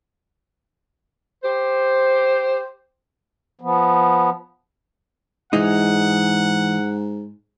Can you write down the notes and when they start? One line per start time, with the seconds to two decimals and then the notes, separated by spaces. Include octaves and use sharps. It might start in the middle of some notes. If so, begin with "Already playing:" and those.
1.44 G4 C5
3.61 F3 B3
5.53 G#2 E3 G#3 D#4 F#5